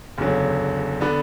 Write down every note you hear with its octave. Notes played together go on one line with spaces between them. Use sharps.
F#1 E2 D3 F#3
D3 B3 D4